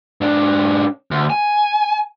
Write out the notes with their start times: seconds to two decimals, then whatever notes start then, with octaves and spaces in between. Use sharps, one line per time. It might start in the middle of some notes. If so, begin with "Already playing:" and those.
0.21 G#2 D4
1.11 D2
1.30 G#5